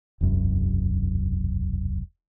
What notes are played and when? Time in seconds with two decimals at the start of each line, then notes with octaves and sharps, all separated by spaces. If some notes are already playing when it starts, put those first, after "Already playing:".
0.21 E1 C2 F#2